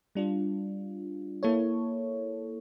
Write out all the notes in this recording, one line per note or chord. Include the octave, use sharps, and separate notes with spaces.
G3 D4 F4
A#3 E4 A4 C#5